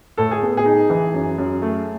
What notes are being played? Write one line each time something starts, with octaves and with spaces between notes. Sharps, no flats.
A2 A4
G#4
B3
G#4
D#4
E3
F#2
F#2
A3